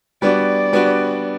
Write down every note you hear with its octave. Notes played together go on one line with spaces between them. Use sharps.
G3 B3 D4 F#4 D5
G3 B3 D4 F#4